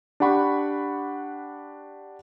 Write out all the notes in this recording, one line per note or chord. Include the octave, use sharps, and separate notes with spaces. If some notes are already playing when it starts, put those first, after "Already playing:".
D4 G4 F#5 B5 C#6